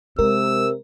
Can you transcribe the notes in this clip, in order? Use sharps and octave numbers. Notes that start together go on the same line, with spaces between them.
C3 G#3 A#4 E6